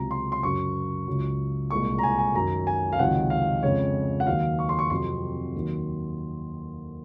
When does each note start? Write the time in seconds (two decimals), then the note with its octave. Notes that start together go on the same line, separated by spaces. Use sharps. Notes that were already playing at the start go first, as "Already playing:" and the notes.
Already playing: C#2 C3 F#3 A#5
0.11 C6
0.32 C6
0.43 F#2 C#3 F#3 C#6
1.07 C#2 C#3 F#3
1.71 C2 A#2 G#3 C#6
1.99 A#5
2.03 G#5
2.19 G#5
2.34 F#2 D#3 F#3 A#5
2.67 G#5
2.93 F5
2.99 C#2 C3 D#3 F#3 F#5
3.30 F5
3.63 F2 C#3 G#3 C#5
4.20 F#5
4.27 D#2 D#3 F#3 F5
4.59 C#6
4.69 C6
4.79 C#6
4.90 F2 C3 F#3 C6
5.55 D#2 D#3 F#3